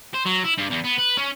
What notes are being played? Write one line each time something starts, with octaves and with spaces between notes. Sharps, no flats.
C5
F#3
E4
G2
E2
B3
B4
C#4